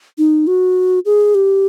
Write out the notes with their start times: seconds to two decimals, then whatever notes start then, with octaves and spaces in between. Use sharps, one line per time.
0.18 D#4
0.47 F#4
1.05 G#4
1.35 G4